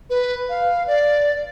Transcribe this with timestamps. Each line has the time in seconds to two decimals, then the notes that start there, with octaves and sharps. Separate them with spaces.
0.10 B4
0.49 F5
0.87 D5